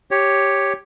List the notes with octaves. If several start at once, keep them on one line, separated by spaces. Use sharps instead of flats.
G4 C#5